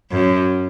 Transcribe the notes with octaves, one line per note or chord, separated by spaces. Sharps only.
F#2